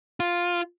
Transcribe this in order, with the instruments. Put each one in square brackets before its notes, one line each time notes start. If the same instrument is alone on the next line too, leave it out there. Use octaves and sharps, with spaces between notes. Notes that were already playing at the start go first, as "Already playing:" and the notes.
[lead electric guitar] F4